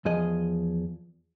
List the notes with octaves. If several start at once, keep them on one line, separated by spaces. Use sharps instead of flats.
E2 F3 G#4 D#5